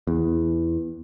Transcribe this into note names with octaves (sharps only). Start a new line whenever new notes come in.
E2